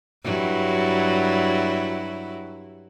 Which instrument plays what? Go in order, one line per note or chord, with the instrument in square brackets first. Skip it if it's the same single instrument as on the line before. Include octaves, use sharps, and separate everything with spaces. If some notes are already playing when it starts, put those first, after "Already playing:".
[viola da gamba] G2 F#3 E4